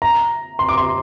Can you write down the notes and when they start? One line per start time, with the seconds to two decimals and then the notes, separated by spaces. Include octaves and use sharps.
0.02 A#5
0.59 C6
0.69 D6
0.77 C6